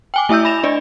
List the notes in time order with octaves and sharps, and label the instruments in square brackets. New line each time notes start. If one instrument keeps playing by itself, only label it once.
[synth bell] G5 G#5 D6
A3 E4 E5 E6 G6
B5 A#6 E7 F7
D4 D5 D#5